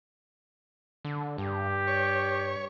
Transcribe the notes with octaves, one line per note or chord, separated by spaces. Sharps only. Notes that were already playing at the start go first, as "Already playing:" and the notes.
D3
G2 G4
C#5